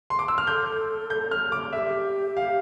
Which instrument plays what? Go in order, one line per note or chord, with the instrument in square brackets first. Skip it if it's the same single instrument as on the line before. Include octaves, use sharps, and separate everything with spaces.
[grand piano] C6
D6
E6
F6
[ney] A4 [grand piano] G6
[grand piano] G6
F6
D6
[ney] A4 [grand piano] E5
[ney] G4
[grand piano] F5